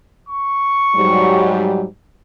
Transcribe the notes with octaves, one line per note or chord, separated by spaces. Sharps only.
C#6
G#2 F#3 G3